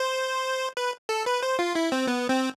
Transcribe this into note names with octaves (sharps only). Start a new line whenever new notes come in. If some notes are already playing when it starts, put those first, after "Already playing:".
Already playing: C5
B4
A4
B4
C5
F4
E4
C4
B3
C4